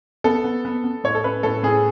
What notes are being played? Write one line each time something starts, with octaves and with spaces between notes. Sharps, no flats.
B3 A4
B3
B3
B3
A2 C#5
A4
C#4 B4
A2 A4
A2 G#4